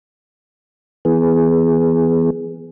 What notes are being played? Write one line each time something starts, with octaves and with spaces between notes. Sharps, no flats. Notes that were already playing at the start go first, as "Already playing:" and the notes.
E3 B3 G#4